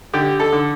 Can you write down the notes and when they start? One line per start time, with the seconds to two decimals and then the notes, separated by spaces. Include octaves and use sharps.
0.13 D3 G4
0.40 A4
0.52 D3